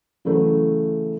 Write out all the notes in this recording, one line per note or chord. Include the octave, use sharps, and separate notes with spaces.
C#3 E3 F#3 A3